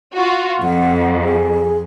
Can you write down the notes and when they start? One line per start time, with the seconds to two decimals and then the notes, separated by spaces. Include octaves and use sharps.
0.14 F4 F#4
0.63 F2 F#5
1.23 G#4